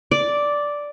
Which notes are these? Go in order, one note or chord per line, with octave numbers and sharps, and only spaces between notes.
D5